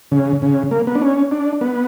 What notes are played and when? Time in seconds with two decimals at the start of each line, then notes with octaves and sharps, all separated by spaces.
0.12 C#3
0.42 C#3
0.71 A#3
0.87 B3
0.95 D4
1.01 C#4
1.31 D4
1.61 B3